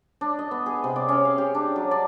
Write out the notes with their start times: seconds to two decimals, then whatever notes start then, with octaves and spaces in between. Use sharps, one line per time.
0.21 D4
0.39 D#5
0.51 B3
0.66 G#4
0.84 C3
0.96 D5
1.09 C#4
1.25 F5
1.38 G4
1.55 D4
1.76 F#3
1.91 D5